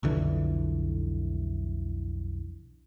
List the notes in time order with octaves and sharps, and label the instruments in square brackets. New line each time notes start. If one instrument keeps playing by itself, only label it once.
[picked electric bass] B1 F2 D3 E3